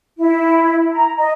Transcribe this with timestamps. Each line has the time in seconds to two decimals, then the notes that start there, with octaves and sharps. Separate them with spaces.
0.18 E4
0.92 A#5
1.16 D#5